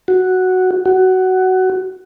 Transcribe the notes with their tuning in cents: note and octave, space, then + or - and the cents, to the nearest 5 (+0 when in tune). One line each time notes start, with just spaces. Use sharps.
F#4 +0
F#4 +15